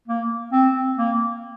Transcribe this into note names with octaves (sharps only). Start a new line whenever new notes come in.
A#3
C4
A#3